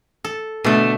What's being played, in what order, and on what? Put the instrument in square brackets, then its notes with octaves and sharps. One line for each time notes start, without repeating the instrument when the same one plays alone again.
[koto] A4
[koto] B2 D3 [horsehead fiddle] A3